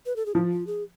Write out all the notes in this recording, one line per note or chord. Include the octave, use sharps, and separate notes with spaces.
B4
A4
G#4
F3 F4
F4
G#4